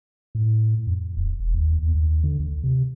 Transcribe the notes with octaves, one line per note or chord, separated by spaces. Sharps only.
A2
F2
D1
E1
D#2
E2
D#2
D3
D2
C3